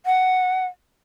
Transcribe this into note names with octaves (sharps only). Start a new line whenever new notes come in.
F#5